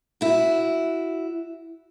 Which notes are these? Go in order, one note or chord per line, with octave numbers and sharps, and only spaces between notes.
E4 F#4